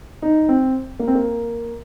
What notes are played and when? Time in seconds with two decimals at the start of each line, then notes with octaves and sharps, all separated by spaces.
0.22 D#4
0.49 C4
0.99 A#3
1.07 C4
1.15 A#3